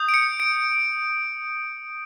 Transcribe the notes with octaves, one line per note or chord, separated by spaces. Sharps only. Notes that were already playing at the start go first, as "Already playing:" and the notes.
Already playing: D#6 G6
D7
C#7
D7